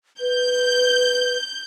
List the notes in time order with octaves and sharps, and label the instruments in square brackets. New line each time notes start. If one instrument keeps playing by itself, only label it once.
[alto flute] B4 [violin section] G6